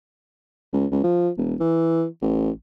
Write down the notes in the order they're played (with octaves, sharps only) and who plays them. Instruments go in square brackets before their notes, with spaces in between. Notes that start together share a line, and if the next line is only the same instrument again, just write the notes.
[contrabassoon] C#2
C#2
F3
E1
E3
A1